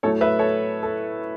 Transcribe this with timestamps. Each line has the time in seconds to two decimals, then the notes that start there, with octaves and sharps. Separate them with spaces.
0.03 A2 F#3 A3 A4 C#5
0.21 B4 E5
0.39 A4 C#5
0.83 A4